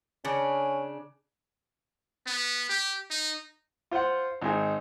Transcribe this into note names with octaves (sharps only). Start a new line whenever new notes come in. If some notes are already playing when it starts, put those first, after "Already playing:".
C#3 C#4 D4
B3
G4
D#4
F4 C5 F5 F#5
G#1 D#4 G#4